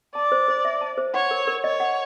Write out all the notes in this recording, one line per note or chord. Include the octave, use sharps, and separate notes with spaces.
D5 A5
C5
C5
E5
A5
C5
C#5 F#5
A#4
A#4
C#5 D#5
F#5